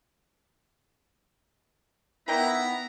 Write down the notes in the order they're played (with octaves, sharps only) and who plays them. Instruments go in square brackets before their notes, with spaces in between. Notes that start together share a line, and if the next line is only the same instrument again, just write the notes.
[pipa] D#3 D5 G5 [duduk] B3 [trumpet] E4 [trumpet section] B4 A#5